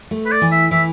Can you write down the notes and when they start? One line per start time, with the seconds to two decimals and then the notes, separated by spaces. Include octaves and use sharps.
0.11 A3
0.26 B4
0.32 D5
0.42 E3
0.51 E5
0.71 E3 E5